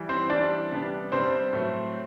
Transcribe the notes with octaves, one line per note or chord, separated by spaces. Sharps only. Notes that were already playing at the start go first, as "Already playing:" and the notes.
Already playing: E3 G3
C4 C5
E3 G3 C4 D4 D5
C3 G3 B3 D4
C3 G3 B3 C4 D4 C5
A2 F#3 A3